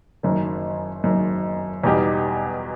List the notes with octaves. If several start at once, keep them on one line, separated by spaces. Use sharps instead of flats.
F#1 F#2 D#3
F#1 F#2 D#3
E2 B2 G3 D#4 G4